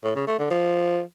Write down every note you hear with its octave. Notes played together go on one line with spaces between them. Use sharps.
A2
C#3
A3
D3
F3